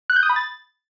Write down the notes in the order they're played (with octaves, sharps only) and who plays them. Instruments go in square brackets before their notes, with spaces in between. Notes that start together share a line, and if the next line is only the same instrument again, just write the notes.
[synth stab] F#6
G6
D#6
B5
A6